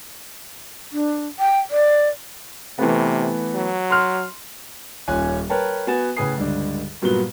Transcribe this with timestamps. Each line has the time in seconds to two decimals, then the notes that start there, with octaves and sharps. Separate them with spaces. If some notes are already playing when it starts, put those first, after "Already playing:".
0.92 D4
1.39 G5
1.70 D5
2.79 C3 E3 A3 B3
3.54 F#3
3.90 C6 F6
5.08 D#1 C#4 F4 C#5 G#5 F#6
5.50 A#4 B4 C#5 G5 A5
5.87 B3 F#4 G#5 A6 E7
6.17 A2 C#3 B4 G#5 D#6 C7
6.37 C#2 G2 D3 D4
7.02 G2 A#2 F#3 B3 F#4 G7